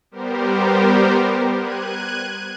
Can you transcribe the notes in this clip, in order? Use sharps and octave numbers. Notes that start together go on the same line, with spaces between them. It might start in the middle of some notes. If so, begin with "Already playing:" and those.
G3 B3 G4 A#4 C5
F#6 G#6 D#7